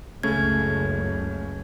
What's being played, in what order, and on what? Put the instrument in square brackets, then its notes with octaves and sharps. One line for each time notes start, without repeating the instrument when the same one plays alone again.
[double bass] F#1 C#2 [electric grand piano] C#3 A3 C#4 [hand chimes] G#6